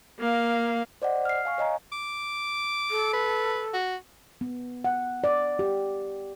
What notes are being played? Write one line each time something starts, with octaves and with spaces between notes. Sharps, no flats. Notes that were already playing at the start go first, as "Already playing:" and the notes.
A#3 F5
C5 D5 D#5 F#5
F6 C7
F5 G#5 C#6
C#5 D#5 G#5 A#5
D6
A4
B4
F#4
B3
F#5
D5
G4